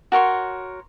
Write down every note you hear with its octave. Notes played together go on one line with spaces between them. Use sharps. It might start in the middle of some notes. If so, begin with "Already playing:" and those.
F#4 A#4 C#5 C6